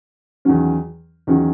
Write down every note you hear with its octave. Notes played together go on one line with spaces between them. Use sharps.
E2 D#3 F#3 C#4
E2 D#3 F#3 C#4